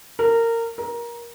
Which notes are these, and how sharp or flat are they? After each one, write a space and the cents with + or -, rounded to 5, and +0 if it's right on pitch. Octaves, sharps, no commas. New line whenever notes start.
A#4 -20
A#4 +20